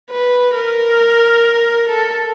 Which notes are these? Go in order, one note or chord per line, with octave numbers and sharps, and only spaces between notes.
B4
A#4
A4